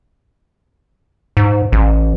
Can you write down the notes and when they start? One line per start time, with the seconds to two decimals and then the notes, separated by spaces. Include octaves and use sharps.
1.37 G#2
1.72 A1